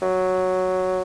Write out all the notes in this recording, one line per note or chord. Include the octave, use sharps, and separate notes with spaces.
F#3